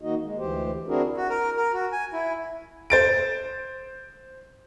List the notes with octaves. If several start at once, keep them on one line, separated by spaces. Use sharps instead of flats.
D#3 A#3 D#4 F#4 D#5
G#3
D2 E3 G4 C5
C4 D4 E4 F#4 G#4 A#4
F#4
A#4
A#4
F#4
G#5
E4
C5 A6 D7